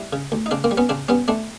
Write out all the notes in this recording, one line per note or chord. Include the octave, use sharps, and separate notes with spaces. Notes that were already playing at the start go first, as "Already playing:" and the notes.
Already playing: G3 E4
C#3
D2
D#4
C#3 C4 D4
A#3 C4
G3
B3 C#4
C#3 C4 D4
G3 B3 C#4
A3 C4 D4